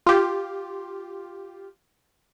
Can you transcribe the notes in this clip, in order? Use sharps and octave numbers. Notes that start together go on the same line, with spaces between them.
F4 G4